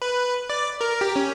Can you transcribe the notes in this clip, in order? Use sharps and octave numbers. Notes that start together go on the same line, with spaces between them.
B4
D5
A#4
G4
C#4